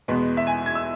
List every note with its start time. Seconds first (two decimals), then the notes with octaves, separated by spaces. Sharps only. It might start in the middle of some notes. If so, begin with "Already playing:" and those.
0.08 E2 B2 G#3 B3
0.37 E5
0.47 G#5
0.66 G#6
0.75 E6